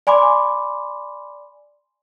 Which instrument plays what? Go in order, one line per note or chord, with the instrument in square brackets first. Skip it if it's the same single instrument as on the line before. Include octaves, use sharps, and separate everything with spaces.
[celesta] D5 G#5 B5 C6 D6